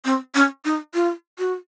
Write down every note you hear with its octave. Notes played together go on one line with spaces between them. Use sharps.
C4
C#4
D#4
F4
F#4